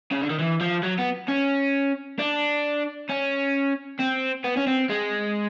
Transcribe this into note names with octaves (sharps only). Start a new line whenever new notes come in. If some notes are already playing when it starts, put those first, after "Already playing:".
C#3
D3
D#3
E3
F3
F#3
B3
C#4
D4
C#4
C4
B3
C#4
C4
G#3